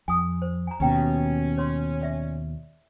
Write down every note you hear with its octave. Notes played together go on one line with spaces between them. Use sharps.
F2 G#5 D#6
C5
G#5 A#5
D#2 B2 C#4 D#4 G5 A#5
C#5 C6
D5 E5